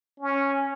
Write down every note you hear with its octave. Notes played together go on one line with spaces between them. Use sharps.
C#4